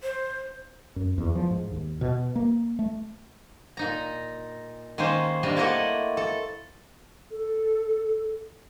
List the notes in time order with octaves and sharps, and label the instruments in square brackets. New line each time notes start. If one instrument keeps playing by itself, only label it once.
[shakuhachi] C5
[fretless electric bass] F#2
E2
F3
G#2
D#2
B2
A#3
A3
[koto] A#2 D#4 A#5
D#3 G#3 A#3 C#4 C5
C3 G3 D4 D#5
A3 A#3 E4 A4 D#5 F#5
A4
[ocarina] A4